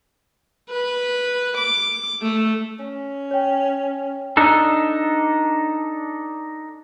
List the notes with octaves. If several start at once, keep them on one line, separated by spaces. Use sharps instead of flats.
B4
D6
A3
C#4
C#5 G5
D4 D#4 A4